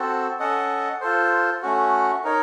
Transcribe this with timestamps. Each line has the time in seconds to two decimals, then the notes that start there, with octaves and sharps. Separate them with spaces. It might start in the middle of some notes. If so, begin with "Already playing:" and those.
Already playing: C4 F#4 A4
0.39 C#4 A4 D#5 F#5
1.01 F4 A4 C5
1.62 A3 C#4 F#4
2.24 D#4 A#4 C#5